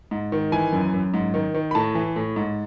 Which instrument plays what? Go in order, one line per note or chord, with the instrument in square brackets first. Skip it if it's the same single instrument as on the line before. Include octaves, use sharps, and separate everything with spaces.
[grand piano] G#2
D#3
E3 G#5
F#2
F#2
G#2
D#3
D#3
B5
A2 A5
E3
A2
G#2